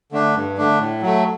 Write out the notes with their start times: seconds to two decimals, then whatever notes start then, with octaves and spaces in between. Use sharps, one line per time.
0.12 D3 A3 D4
0.36 G2
0.57 D3 A3 D4
0.80 A2
1.02 F#3 A3